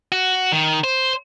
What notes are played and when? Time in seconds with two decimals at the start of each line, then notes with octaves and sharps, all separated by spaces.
0.12 F#4
0.52 D#3
0.84 C5